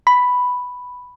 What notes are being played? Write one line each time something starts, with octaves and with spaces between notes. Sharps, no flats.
B5